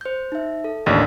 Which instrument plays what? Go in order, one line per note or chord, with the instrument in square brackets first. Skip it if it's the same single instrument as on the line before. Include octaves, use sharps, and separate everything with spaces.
[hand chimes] C5 G6
D#4 E5
A4
[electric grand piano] A1 D#2 [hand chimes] D4 D5